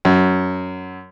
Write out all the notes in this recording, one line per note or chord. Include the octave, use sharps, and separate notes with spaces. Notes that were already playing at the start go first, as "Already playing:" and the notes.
F#2